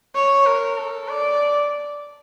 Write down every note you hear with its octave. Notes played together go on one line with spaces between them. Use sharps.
C#5
A#4
A4
D5